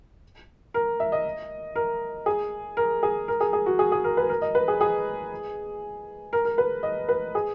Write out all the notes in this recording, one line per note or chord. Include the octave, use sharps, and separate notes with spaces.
A#4
E5
D#5
A#4
G#4
A#4
G#4
A#4
G#4
G#4
F#4
G#4
G#4
A#4
B4
A#4
D#5
B4
G#4
G#4
A#4
A#4
B4
D#5
B4
G#4